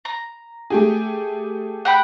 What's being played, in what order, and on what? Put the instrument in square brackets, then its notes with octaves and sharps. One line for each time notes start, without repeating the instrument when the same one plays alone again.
[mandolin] A#5
[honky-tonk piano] A3 G4 G#4
[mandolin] F#5 G5 B5